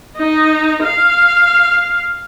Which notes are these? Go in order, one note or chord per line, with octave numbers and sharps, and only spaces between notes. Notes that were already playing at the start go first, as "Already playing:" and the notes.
D#4
F5